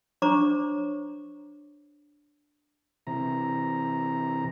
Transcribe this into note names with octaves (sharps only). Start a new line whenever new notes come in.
D4 C5 C#5 A#5 C#6 D6
C3 E3 A#5